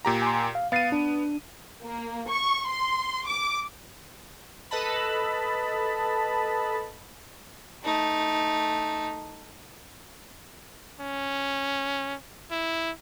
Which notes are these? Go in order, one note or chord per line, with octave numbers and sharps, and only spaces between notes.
A#2 G4 A#5
G#5 C6
F5
B3 F5 A6 C7 D#7
D4
A#3
C#6
C6
D6
A4 B4 D#5 A5 B5
A3 D#4
C#4
E4